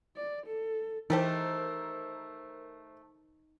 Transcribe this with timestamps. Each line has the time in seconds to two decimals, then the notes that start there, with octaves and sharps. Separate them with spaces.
0.16 D5
0.46 A4
1.10 E3 A3 D#4 G4 A4 A#4 C5